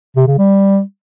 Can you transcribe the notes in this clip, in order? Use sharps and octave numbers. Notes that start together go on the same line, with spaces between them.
C3
C#3
G3